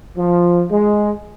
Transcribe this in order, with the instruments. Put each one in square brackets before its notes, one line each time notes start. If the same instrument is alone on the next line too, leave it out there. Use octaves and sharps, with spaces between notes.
[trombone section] F3
G#3